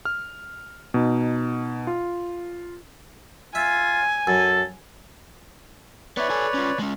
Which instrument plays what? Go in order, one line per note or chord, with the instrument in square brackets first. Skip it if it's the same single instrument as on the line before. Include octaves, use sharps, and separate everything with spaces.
[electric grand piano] F6
B2 D#4
F4
[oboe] F4 [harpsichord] E5 [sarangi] G#5
[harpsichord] F#2 [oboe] A4
[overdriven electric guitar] B3 E5 [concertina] B4 C#5 D5
[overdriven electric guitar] A4 G#5
C#4 F4
G#3 C#4